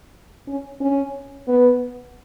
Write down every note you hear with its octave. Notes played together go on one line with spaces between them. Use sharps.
C#4
C#4
B3